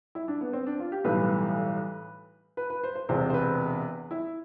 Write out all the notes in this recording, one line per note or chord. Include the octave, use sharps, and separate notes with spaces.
E4
D4
B3
C4
D4
F4
G4
B1 A2 E3 G3 B4
B4
B4
C5
C5
E1 E2 C3 C5
C5
B4
E4